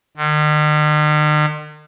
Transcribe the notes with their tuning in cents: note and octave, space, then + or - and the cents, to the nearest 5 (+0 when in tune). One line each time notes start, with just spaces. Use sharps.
D#3 -45